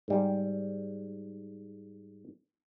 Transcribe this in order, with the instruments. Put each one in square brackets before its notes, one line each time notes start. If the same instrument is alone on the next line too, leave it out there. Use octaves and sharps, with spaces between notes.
[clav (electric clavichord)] G#2 G3